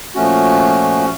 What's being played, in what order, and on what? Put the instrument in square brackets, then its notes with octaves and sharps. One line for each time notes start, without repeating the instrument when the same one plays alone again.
[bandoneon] A#2 F3 A3 C#4 F#4